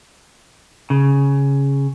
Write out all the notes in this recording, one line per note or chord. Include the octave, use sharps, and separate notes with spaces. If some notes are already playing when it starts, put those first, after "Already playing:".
C#3